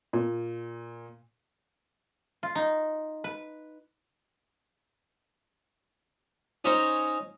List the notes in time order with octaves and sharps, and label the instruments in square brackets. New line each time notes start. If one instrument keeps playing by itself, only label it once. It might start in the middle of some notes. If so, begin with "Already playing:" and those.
[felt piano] A#2
[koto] F4
D#4
B4
[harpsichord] C#4 D#4 C5 C#5 A#5